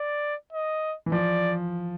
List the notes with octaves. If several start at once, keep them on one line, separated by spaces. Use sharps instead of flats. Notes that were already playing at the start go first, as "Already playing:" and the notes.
Already playing: D5
D#5
E3
F3 D5